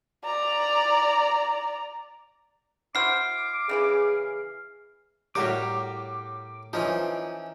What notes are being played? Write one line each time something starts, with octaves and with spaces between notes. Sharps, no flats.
D5 A#5
E4 F#4 C5 D6 F6 C7
C#3 E3 C#4 G#4
A2 G3 F#4 G4 A#4 C#5 D6
E3 F3 C#4 D#4